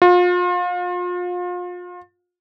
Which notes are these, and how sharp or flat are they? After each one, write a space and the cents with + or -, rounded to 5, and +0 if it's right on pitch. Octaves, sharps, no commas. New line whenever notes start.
F4 +35